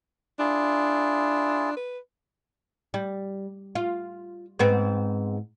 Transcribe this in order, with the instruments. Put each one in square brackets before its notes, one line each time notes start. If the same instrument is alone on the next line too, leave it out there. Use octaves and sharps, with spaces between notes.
[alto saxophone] D4 [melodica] E4 F4 G#4
[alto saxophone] B4
[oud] G3
F4
G#2 B3 C4